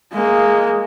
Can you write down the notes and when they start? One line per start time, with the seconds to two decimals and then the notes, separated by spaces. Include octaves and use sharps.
0.13 G#3 A#3